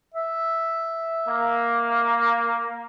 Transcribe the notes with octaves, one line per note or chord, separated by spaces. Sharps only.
E5
A#3